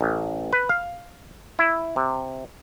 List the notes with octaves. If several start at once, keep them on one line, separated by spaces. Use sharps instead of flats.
A1
B4
F5
E4
C3